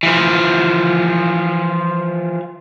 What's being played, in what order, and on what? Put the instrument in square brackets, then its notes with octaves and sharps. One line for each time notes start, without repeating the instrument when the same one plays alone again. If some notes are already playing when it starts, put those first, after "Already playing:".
[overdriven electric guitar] E3 F3